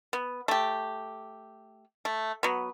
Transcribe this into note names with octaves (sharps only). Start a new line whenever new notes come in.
B3
A3 G4
A3
F#3 B3